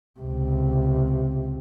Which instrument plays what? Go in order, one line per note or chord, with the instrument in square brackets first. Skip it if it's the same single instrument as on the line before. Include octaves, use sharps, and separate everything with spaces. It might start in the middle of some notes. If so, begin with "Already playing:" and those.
[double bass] C#2 C3